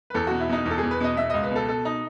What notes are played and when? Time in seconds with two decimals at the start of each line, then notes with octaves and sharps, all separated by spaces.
0.10 B4
0.14 E2 A4
0.27 B2 F#4
0.40 E4
0.49 B2 D#4
0.65 E2
0.71 A4
0.78 E2 G#4
0.91 B4
1.00 B2 D#5
1.16 B2 E5
1.30 C#2 D#5
1.43 B4
1.51 B2 A4
1.68 B2 A4
1.85 D#4